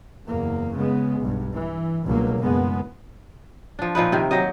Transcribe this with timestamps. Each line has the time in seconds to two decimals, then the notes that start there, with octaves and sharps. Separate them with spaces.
0.27 F#1 E2 A#3
0.76 C#3 G#3 B3
1.21 B1 G2
1.56 E3
2.05 C#2 G2 B2 F#3 A#3
2.40 F#1 G#3 B3
3.79 F3 D4
3.95 A#2 F3 D#4 B4
4.12 C3 D#3 A#3
4.31 F#3 D#4 G4 D#5